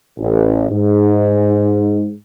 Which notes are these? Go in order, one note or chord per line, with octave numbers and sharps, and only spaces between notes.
A1
G#2